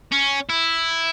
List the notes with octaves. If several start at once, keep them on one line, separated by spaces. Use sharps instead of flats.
C#4
E4